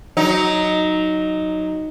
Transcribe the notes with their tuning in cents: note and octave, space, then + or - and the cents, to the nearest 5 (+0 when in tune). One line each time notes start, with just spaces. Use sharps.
F#3 +5 D#4 +0